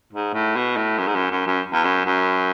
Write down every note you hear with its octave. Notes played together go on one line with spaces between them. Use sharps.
G#2
A2
B2
A2
F#2
G#2
F#2
F#2
F#2
E2
F#2
F#2